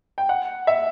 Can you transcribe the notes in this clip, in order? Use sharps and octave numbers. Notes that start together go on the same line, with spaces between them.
G5
F#5
E5